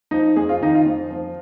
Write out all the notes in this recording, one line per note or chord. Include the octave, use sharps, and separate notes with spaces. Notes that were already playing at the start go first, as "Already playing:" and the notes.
F3 D#4
F2 G#4
F4
D#3 D#4
F4
F2
F3